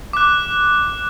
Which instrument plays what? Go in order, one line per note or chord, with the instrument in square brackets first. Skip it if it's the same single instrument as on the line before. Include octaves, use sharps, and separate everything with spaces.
[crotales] D6 F#6